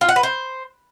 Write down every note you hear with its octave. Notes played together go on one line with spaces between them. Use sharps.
F4
F#5
B4
C5